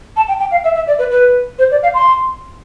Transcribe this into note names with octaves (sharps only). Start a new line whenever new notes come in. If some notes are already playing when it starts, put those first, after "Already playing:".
A5
G5
G5
F5
E5
E5
D5
B4
B4
C5
D5
F5
C6